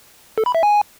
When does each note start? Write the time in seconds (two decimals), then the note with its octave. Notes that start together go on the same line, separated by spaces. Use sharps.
0.38 A4
0.46 B5
0.55 E5
0.63 G#5